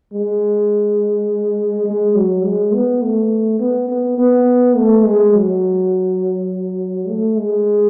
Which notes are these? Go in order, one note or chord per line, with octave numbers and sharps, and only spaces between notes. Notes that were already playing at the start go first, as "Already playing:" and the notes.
G#3
G#3
F#3
G#3
B3
A3
B3
B3
B3
A3
G#3
F#3
A3
G#3